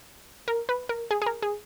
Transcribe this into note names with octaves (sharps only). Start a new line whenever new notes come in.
A#4
B4
A#4
G#4
G#4
A#4
G#4